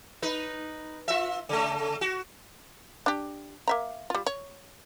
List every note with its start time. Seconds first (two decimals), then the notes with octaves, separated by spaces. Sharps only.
0.22 D#4 B4
1.08 F4 E5
1.49 C#3 A3
2.01 F#4
3.06 D4 G4
3.68 A#3 E5 A#5
4.10 G3 F4
4.26 C#5